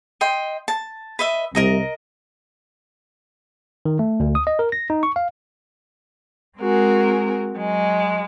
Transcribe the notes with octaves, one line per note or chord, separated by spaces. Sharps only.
D#5 G5 C6
A5
B4 D#5 E5
C2 C3 A#4 D#5 A#5
D#3
A3
D2
D#6
D#5
A#4
A#6
D#4
C#6
F5
G#3 C4 F#4 G#4 A#4
F#3 G#3